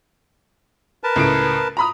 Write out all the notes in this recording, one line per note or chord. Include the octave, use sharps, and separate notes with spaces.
A#4 B4 A5
C#2 A2 D7
A#5 B5 D#6